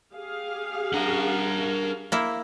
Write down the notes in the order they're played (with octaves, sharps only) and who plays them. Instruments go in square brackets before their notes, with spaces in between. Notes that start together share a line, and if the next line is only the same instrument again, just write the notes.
[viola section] G4 G#4 F5
[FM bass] D4 [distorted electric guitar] A#4 F#5
[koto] A#3 E4